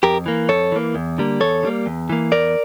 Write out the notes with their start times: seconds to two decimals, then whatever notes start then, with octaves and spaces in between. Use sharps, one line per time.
0.03 F2 G4 A#4
0.26 E3 A#3
0.49 F2 A4 C#5
0.72 E3 A#3
0.95 E2
1.18 D3 G3 A#3
1.40 E2 A4 C#5
1.63 D3 G3 A#3
1.86 E2
2.09 E3 A#3
2.32 E2 A#4 D5